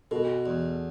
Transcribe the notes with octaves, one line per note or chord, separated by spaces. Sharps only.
B2 F#4 A4
E2